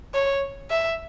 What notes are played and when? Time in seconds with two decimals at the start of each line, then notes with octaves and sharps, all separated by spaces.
0.14 C#5
0.71 E5